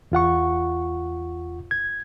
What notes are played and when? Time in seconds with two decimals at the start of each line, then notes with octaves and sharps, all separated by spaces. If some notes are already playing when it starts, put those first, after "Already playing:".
0.12 E2 F4 F#5 C#6
1.71 G#6